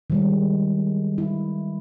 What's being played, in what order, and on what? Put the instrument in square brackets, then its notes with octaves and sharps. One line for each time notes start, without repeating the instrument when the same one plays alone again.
[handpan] D#3 G3 G#3
E4